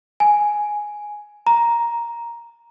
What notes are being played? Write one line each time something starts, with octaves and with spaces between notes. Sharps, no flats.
G#5
A#5